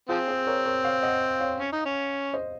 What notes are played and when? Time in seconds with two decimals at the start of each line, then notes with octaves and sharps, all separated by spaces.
0.09 F3 C4 F4 G#4
0.28 G#4 C5
0.47 A#4 C#5
0.65 A#4 C#5
0.84 C#5 F5
1.03 D#5 F#5
1.40 C#5 F5
1.59 C#4
1.72 D#4
1.85 C#4
2.34 C5 D#5